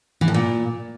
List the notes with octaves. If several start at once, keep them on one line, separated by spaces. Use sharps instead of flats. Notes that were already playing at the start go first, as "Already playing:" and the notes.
E3
A2
A#2